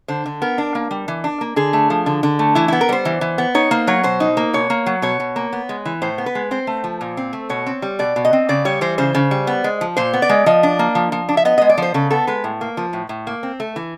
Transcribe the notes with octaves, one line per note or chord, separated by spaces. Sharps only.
D3 C5
D3
B3 A#4
D4
A#3
G3
E3
D4
A#3
D3 G#4
A3
F3
D3
D3
A3
E3 E4
B3 E4
A#4
G3 C5
E3
E3
B3
D#4 C#5
A#3 C5
F#3 C#5
B2 C5
D#4
A#3
B2 C#5
A#3
F#3
B2 C#5
B2
A#3
B3
G#3
E3
A2 C5
B3
B4
G#3
C4 C5
A3
F3
A#2
C4
A3
B2 C#5
C4
G3
B2 D5
B2
D#5
C4
C#3 D5
G3 C#5
E3 C5
C#3 C5
C#3
G3
B3
G#3
F3
A#2 C5
B3
D5
G#3
F3 D#5
D4
A#3
F3
F3
D4
E5
B3 D#5
G#3 D#5
D5
F3 C5
C#3 A4
B3 A4
G#3 B4
A2
A#3
F3
A2
A2
A#3
C4
A3
E3